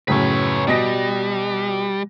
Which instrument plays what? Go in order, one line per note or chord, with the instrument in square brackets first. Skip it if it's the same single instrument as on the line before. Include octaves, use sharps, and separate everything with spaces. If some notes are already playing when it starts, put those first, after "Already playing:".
[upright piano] F#2 A2 C#3 [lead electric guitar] B4 C#5
[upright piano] B2 D#5 A#6 [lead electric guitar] G3